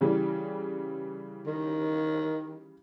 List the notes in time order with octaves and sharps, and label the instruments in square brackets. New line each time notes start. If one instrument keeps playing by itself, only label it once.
[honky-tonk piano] C#3 E3 G3
[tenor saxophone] D#3